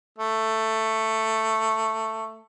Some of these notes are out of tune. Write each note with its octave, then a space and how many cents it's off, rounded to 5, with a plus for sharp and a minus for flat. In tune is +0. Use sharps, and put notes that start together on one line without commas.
A3 +10